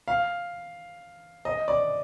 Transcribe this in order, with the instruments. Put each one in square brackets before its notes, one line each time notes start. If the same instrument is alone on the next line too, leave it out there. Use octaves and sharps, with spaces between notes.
[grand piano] F5
D#5
D5